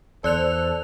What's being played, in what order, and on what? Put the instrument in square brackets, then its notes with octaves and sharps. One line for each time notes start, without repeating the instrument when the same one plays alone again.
[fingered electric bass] E2 [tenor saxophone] A4 [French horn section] C5 [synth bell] D5 F#6 F7